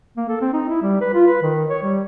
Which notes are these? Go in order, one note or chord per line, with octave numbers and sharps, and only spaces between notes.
A#3
A4
C4
D#4
E4
G3
B4
F4
B4
D#3
C#5
G3